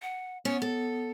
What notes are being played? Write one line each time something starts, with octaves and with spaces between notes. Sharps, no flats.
F#5
B3 C#4
A4